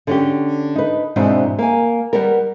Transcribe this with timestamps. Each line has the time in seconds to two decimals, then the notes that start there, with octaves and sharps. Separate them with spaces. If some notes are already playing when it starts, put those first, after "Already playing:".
0.07 D3 C#4 G4
0.76 D#4 B4
1.16 E2 G#2 B2 E3 C4 D4
1.58 A#3 G#5
2.13 G3 B3 A#4